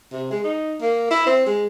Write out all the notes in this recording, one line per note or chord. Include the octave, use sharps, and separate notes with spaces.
C3
G#3
D#4
A#3
E4
C4
G#3